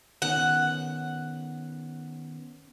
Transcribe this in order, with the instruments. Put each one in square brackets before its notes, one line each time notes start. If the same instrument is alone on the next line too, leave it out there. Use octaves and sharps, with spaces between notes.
[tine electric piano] D#3 B3 C#4 [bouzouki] F#5